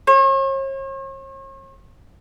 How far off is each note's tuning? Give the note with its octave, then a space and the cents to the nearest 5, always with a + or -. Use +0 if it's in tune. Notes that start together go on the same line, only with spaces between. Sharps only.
C#5 -45